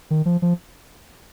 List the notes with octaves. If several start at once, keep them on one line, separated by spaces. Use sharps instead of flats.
D#3
F3
F3